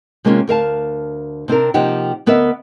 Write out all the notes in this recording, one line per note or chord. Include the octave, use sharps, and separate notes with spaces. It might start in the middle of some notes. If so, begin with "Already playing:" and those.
C3 G#3 A#3 C4 C#4 F4
D2 A#4 F5 A5
C3 C4 D4 A#4
C3 F3 A#3 D#4 G4 F#5
D2 B3 A#4 D#5 E5